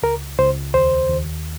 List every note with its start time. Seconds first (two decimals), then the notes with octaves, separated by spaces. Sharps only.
0.03 C#2 A#4
0.39 C#2 C5
0.74 D#2 C5
1.10 D#2